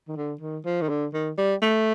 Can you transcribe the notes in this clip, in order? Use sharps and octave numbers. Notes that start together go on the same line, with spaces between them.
D#3
D3
D#3
F3
D#3
D3
D#3
G3
A3